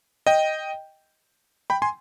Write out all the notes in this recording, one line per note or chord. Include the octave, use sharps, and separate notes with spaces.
D#5 G5
G5 B5
G#5 C6